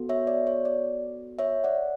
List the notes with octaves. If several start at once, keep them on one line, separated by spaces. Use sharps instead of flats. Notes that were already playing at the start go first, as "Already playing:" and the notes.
Already playing: B3 F#4 A4
C#5 E5
D5
C#5
D5
C#5 E5
D5 F#5